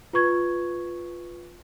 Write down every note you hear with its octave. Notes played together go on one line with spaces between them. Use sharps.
F4 B4 C#6 G#6